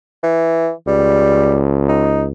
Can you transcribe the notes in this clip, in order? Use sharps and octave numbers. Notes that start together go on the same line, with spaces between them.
E3
C#2 G3
D#4